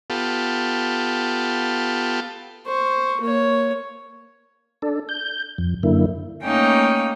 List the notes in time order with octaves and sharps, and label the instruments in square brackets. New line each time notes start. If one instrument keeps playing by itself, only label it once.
[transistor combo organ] B3 F4 G4 A4
[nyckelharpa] C5 C#6
A#3 C#5
[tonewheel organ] D4 A4
G6
F2
F#2 D3 A#3 E4
[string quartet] A3 A#3 C#4 D#4 G5